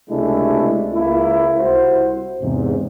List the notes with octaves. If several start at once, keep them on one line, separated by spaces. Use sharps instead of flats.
C#2 C3 G#3 A3 D4 E4
C#2 A#3 E4
C2 E4 F#4 C5
E2 G#2 C3